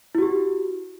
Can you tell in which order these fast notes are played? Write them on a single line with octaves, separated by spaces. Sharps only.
E4 F#4 G4